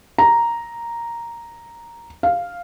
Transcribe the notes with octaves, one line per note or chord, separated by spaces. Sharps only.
A#5
F5